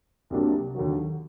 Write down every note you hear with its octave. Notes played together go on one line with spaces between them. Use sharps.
C2 C3 F#3 A#3 D4
D#2 D3 F#3